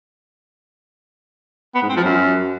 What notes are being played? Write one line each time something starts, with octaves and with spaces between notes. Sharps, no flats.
B3
G#2
C4
F3
F#2